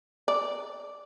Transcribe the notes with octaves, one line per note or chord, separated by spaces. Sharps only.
D5